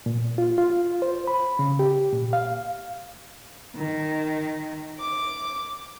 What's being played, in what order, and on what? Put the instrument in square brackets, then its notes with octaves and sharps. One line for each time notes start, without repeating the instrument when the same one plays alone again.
[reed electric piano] A#2
F4
F4
C5
B5
C#3
G4
A#2
F5
[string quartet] D#3
D6